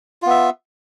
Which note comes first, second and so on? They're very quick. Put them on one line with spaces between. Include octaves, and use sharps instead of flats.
F4 B3 E5